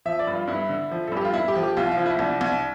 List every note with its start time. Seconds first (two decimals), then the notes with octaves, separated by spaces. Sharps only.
0.05 F3 E5
0.19 D5
0.27 G2
0.34 F4
0.47 G2 E4
0.69 D3
0.91 F3
1.07 A4
1.12 G2 G4
1.25 F4
1.33 G2 E4
1.48 G4
1.55 F3
1.63 G4
1.77 C2 F4
1.91 F4
1.97 F3
2.06 E4
2.19 C2 D4
2.41 C2